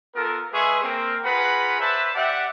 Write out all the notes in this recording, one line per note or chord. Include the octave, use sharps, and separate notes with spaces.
B3 F4 A4 A#4
G#3 G#4 B4 E5 C6 C#6
A#3 C4 A#4
F4 G#4 B4 F#5 A#5 B5
B4 C5 D5 E5 A5 B5
G4 D5 E5 F#5